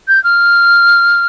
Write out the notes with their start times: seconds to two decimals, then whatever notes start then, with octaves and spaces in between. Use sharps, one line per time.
0.08 G6
0.24 F6